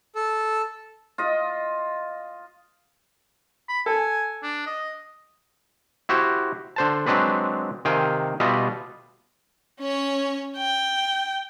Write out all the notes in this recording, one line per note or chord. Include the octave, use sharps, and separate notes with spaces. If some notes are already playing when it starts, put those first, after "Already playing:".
A4
F4 D#5
B5
A4 G#5
D4
D#5
E4 F#4 G4 C5
D3 C5 A5
F#3 G#3 C4 D4 B4
C3 D#3 F5 G5 G#5
B2 G3 F4 D#5 E5
C#4 C#5
G5